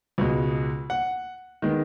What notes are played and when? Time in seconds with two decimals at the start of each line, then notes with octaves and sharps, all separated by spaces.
0.18 C#2 B2 G#3
0.90 F#5
1.62 D#3 G#3 B3